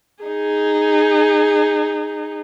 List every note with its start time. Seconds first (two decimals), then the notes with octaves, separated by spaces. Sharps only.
0.23 D#4 G#4